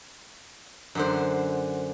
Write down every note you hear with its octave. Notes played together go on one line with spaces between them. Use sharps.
F#2 D3 C5